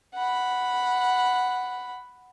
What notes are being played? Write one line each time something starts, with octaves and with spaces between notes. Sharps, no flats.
F#5 B5